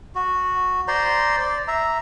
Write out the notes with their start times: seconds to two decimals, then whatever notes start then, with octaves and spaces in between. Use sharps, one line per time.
0.15 F#4
0.88 C5 D5 A#5 C6
1.40 D5
1.68 E5 A#5